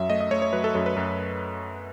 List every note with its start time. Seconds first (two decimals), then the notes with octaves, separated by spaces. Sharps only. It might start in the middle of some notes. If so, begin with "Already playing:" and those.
Already playing: F#2 F#3 E5
0.09 A3 D#5
0.21 D#5
0.31 A3 C#5
0.42 C#5
0.53 F#3 B4
0.64 A4
0.75 F#2 A4
0.86 B4
0.96 F#2